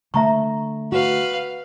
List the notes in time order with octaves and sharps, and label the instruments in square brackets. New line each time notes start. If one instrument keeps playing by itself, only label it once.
[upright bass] D3 A3 [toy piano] E5 A#5 C#6
[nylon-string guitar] F#4 [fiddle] B4 F5